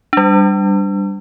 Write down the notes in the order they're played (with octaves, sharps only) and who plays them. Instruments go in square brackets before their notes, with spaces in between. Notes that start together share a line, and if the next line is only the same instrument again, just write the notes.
[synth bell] G3 D4